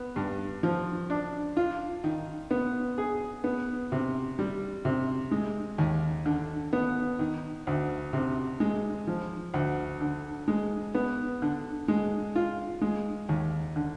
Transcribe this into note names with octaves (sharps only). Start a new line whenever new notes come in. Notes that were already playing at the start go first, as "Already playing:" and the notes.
Already playing: B3
G2
F3
D4
F4
D#3
B3
G#4
B3
C3
G3
C3
G#3
D#2
D3
B3
D#3
D2
C3
G#3
F3
D2
D3
G#3
B3
D3
G#3
F4
G#3
D#2
D3